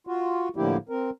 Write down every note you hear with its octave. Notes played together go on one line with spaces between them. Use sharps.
F4 F#4
A2 D3 F3 A#3 E4 G4
C4 A#4